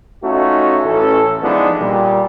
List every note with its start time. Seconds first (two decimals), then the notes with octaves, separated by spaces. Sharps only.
0.23 A3 C#4 D#4 F4 F#4
0.85 A1 C#4 A4
1.42 E3 F3 G#3 B3 D4 D#4
1.80 A#2 G3